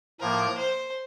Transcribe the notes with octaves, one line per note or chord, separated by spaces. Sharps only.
A2 F3 A#3 A#4
C5